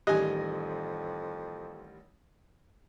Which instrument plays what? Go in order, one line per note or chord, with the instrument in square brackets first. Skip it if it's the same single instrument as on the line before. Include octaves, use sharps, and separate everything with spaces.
[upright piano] A1 D#3 G3 [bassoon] F2 [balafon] G4 [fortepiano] D#5 G#5